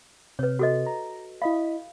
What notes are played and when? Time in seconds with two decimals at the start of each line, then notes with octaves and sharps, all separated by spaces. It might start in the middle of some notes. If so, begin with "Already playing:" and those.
0.39 C3 B4 C#5
0.59 F#4 A4 D#5
0.86 A#5
1.42 E4 D#5 F5 B5